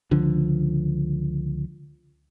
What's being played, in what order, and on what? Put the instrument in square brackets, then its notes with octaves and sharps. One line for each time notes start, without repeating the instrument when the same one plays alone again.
[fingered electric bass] C#2 D3 F3